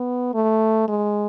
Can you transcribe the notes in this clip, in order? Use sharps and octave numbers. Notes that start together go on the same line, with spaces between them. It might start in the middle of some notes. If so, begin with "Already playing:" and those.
Already playing: B3
A3
G#3